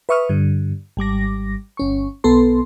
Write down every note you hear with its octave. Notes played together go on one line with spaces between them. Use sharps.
B4 E5 C#6 D#6 F6
G2 D3
G#1 G3 D6 A#6
G1 C#4 C#6
B1 B3 A4 C6